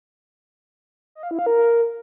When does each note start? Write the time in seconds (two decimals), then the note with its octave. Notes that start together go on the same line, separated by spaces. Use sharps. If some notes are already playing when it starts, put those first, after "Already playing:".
1.15 D#5
1.23 F5
1.31 E4
1.39 F5
1.46 A#4